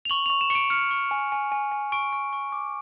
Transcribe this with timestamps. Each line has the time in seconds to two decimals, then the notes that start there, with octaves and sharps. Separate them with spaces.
0.05 F7
0.10 C#6 F#7
0.26 F7
0.30 C#6
0.41 E7
0.50 C#6 C#7
0.55 D7
0.70 F6 C#7
0.91 C#6
1.11 G#5
1.32 G#5
1.52 G#5
1.72 G#5
1.92 C#6 D7
2.13 C#6
2.33 C#6
2.52 D6